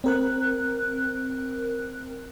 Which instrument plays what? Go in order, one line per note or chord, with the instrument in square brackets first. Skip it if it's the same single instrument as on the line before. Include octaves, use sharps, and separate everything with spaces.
[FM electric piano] C4 A#4 F#6